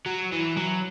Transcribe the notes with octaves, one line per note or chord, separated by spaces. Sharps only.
F#3
E3
F#3